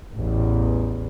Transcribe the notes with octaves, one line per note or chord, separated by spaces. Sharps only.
A1 E2